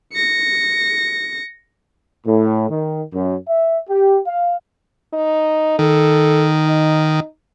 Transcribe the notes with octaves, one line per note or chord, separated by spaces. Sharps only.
A#6 C#7
A2
D#3
F#2
E5
G4
F5
D#4
D#3 A4
D#4